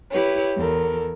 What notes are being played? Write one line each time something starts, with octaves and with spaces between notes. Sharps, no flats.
E4 G4 B4 C#5
E2 A4 A#4